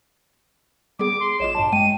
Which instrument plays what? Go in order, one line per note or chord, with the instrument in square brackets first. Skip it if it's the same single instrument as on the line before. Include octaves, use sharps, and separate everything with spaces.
[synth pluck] G3 B3 G#4 [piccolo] D6
[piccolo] C6
[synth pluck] A#1 F4 [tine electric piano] C#5 D#5 [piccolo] E7
[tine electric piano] G2 A5
[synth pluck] G#3 [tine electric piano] G5 [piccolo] D#7